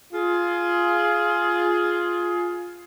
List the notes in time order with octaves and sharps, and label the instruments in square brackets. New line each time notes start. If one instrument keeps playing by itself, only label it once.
[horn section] F4 G#4